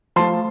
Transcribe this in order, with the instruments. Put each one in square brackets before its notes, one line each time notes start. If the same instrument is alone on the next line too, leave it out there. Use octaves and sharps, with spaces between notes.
[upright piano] F3 A3 A5 C6